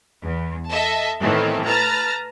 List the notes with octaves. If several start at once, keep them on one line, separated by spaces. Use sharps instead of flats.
E2
A4 D#5 E5 A5
A2 D#3 E3 A3 B3 C4
B4 A5 A#5 F6 A6